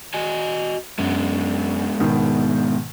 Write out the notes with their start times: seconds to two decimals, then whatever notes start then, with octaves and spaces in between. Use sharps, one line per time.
0.14 F#4 D#5 G#5
0.99 F#2 G#3 B3 D4
2.00 G#2 B2 D#3